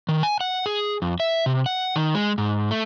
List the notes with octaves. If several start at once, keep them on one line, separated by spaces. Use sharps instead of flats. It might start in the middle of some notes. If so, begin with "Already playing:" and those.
D#3
G#5
F#5
G#4
F2
E5
C3
F#5
D#3
G#3
G#2
A3